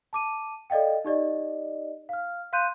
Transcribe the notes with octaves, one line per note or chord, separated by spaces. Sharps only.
A5 D6 D#7
A4 D5 D#5 F5 G5
D#4 G4 D5 D#5
F5 F6
F5 C6 F#6 G6 D#7